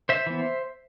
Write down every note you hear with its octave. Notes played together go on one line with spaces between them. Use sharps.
C5 E5
E3 B3